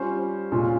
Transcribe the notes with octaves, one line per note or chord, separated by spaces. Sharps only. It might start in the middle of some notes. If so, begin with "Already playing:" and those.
Already playing: G3 C#4 F4 C5
A#2 G#3 C#4 F4